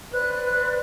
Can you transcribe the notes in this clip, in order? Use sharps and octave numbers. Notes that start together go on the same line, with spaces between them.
B4 C5 D5 F#6